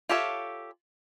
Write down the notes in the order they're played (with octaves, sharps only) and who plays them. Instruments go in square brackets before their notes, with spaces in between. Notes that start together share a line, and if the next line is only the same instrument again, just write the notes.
[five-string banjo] F4 G4 A4 C#5 E5